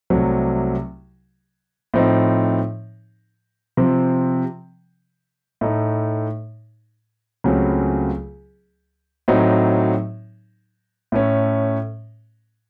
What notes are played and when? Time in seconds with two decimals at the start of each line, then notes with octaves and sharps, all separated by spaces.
0.10 C2 C3 F#3 A3
1.94 A2 F3 C4 D#4
3.77 C3 F3 C4
5.61 A2 A3 D#4
7.44 C#2 C#3 F#3 A3 C4
9.28 A2 F#3 C4 D#4
11.12 A2 A3 C#4